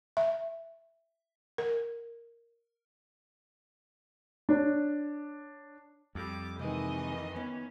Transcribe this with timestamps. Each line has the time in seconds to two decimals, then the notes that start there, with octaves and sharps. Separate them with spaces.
0.17 E5
1.58 A#4
4.49 D4 C#5
6.15 F2 G3 D6
6.59 C3 D#3 E3 G#3 A#3 D#5 G#5
7.36 B3 C#4